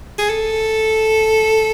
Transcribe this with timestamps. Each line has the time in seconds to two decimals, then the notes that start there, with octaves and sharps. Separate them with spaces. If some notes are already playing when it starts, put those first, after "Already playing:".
0.18 G#4
0.29 A4